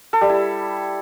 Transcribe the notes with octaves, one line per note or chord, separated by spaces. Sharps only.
A4
G3
E4